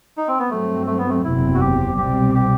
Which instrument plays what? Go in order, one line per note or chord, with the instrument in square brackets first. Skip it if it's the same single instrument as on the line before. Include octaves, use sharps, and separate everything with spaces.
[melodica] D#4
C4
B3
[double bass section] G2 F#3 C4 [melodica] A3
[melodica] A3
B3
A3
[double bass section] F#1 E2 C3 F#3 C4 [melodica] E4
[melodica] F#4
G4
[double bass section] C2 B2 G3 C4 [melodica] G4
[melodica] G4